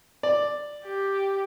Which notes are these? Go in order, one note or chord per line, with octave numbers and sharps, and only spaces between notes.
D5
G4